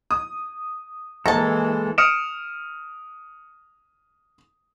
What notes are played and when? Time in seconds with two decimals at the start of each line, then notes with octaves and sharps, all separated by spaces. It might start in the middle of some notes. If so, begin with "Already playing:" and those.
0.11 D#6
1.26 E3 G#3 A#3 A4 A5 A#5
1.98 D#6 F6 C#7 D7 E7